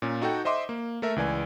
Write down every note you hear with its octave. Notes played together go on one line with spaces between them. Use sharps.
A#2 C#4
D#4 F#4 A4 F#5 G5
C5 D#5 E5 C6 D6
A#3
A3 A4 A#4 E5
C#2 E3 D5 G#5